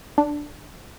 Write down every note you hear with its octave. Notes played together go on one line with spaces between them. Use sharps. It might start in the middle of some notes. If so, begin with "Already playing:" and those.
D4